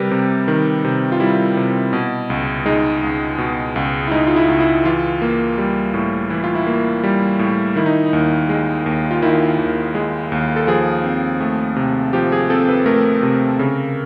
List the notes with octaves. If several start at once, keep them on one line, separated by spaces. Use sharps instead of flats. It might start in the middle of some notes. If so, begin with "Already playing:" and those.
Already playing: C3 G3 G4 A#4 B4
C3
D#3
C3
F4
G3 E4
C3
B2
C#2
G#3 D#4
C#2
B2
C#2
E4
G#3 D#4
F4
E4
C#2
E4
E3 F4
A#3
G3
A2
E3 E4
F4
E4
A#3
G3
A2
D#3 E4
D#4
D#4
D#2
G#3
D#2
F4
D#3 E4
D#2
G#3
D#2
A4
F3 G#4
C4
A3
C3
F3 G4
G#4
C4 A4
B4
A3 A#4
C3
C#3